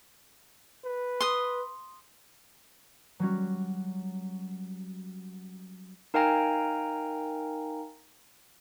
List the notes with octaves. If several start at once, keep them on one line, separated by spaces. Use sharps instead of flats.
B4
C6 D#6
F#3 G3 C#4 F#4
D#4 A#4 F5 G5 G#5 A#5